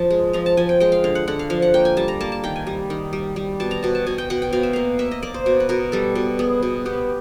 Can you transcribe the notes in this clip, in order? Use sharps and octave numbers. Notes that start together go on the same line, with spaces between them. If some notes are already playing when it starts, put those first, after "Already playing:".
Already playing: F3 A5
G#3
F3 A#5
A5
F3 G#5
G5
G#3 G5
F5
D3 F5
F#5
D3 F#5
F5
F3 F5
F#5
A#3 G5
G#5
G3 A5
A#5
A#3 A5
A5
D#3 G5
G#5
G3
D#3
G3
G3
B2 A5
A#5
B2 A5
A5
B2 G#5
G5
B2 F#5
G5
B2 F5
E5
A#3 F5
A#3 E5
D#5
A#3 D5
C5
B2
B4
B2 A#4
G3 A4
B2
B3 G#4
B2
B3 G4